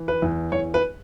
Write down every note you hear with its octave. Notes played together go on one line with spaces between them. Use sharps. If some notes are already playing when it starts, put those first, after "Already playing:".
Already playing: E3
B4
E2
E2 C#5
B4